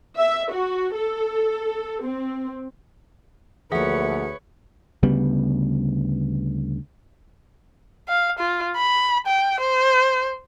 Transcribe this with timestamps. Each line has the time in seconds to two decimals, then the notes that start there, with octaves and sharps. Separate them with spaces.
0.19 E5
0.52 F#4
0.94 A4
2.04 C4
3.72 D2 F3 A#3 G#4 B4 C#5 E5 F#5
5.03 D2 C#3 G3 B3
8.09 F5
8.39 F4
8.76 B5
9.27 G5
9.60 C5